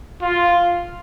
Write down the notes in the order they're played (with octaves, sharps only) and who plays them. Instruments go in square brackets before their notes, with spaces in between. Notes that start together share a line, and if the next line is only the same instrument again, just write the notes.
[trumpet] F4